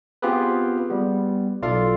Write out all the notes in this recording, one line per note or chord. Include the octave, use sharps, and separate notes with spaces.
B3 C4 F4 G4 G#4 B4
G3 B3
B1 F4 A4 D5 F5